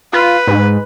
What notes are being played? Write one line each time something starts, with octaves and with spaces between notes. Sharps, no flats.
F4 B4
G#2